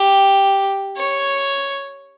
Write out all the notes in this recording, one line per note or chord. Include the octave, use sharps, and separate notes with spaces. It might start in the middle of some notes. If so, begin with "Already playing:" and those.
Already playing: G4
C#5